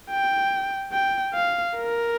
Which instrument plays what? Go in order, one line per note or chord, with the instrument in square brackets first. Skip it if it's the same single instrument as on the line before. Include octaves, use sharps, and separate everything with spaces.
[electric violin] G5
G5
F5
A#4